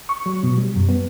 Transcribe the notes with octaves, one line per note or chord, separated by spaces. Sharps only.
C#6
F#3
B2
G3
F#2
B3